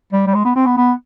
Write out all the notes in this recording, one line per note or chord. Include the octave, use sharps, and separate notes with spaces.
G3
G3
G#3
B3
C4
B3
B3